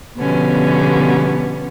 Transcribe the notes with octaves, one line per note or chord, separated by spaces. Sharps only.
B2 D3 F3 G3 B3 C#4